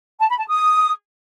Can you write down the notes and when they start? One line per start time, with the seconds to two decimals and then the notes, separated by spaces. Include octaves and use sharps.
0.20 A5
0.29 B5
0.39 A5
0.48 D#6